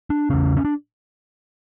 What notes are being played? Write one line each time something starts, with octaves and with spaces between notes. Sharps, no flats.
D4
E2 C#3 C#4
C#4
D4